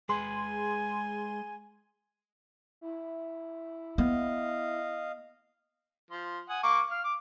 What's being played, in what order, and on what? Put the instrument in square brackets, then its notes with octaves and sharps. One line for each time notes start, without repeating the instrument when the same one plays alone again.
[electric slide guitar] G#3 B4 [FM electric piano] G#4 C6 [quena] G#5
[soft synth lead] E4
[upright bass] B3 [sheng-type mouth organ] D#5 F5
[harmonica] F3 C6
F#5 G#5 D#6
A#3 C#6 D6
F5 F6
D6